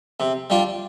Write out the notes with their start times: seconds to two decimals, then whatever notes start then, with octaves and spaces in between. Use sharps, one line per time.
0.20 C3
0.50 G3 D4 F4